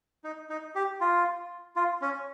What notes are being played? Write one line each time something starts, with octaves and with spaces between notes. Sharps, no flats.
D#4
D#4
G4
F4
F4
C#4